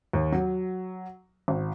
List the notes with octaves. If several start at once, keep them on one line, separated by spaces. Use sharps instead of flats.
D#2
F#3
G#1